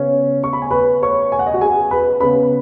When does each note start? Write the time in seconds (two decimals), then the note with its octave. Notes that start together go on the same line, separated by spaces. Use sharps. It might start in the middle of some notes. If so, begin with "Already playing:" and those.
Already playing: C#3 B3 C#4 C#5
0.44 C#6
0.53 B5
0.62 G#5
0.71 B4 B5
1.02 C#5 C#6
1.32 G#5
1.39 F#5
1.46 D#5
1.54 F#4 F#5
1.61 G#4 G#5
1.91 B4 B5
2.20 C#3 B3 B4 B5